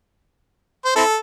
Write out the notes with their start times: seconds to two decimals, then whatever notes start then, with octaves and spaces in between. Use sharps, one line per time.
0.85 C5
0.96 C4 E4 A4